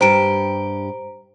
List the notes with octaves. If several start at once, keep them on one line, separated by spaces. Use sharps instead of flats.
G2 G4 C5 A#5 D7